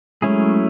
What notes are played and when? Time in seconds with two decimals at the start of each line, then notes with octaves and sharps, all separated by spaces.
0.22 F#3 G#3 A3 C#4 E4 G#4